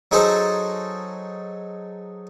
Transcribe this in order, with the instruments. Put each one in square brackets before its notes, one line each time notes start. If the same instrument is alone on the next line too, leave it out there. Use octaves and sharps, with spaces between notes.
[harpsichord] F#3 D#4 G#4 A4 C5